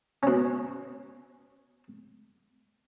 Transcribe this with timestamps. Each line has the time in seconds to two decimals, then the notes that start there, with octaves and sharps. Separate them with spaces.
0.23 B2 C#4